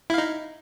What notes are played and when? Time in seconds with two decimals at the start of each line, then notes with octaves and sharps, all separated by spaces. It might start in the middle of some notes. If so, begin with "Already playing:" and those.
0.10 E4
0.14 F5
0.18 D#4